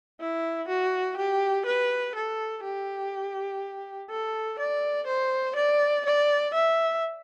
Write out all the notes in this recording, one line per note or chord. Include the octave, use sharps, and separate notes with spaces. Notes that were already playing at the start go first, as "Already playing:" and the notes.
E4
F#4
G4
B4
A4
G4
A4
D5
C5
D5
D5
E5